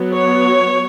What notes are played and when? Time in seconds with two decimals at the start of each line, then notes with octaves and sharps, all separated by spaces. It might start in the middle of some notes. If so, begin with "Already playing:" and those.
Already playing: F#3 B3
0.16 C#5